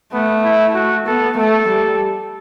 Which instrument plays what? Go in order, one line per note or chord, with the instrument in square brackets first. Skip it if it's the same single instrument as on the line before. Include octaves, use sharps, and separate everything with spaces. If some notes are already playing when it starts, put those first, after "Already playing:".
[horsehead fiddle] A3 [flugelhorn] B3
[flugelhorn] E4
F#4
[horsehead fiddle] B3 [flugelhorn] A4
[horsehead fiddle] A3 [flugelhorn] A4
[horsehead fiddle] G3